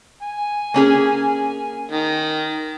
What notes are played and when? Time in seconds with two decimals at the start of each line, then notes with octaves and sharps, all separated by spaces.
0.22 G#5
0.74 A#3 C#4 G#4
1.91 D#3